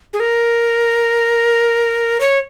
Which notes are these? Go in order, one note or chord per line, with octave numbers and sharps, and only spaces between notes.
G#4
A#4
C#5